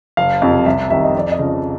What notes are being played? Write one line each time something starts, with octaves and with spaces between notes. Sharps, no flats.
F#1 F5
F2 C3 F3
C2 E5
C3 D#3 E5
D#5
F2 D5
D#5
C#3 F3